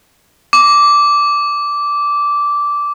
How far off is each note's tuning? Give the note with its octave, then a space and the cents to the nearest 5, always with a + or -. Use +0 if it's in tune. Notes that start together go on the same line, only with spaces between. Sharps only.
D6 -10